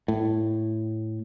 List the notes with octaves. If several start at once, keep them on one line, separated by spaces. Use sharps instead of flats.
A2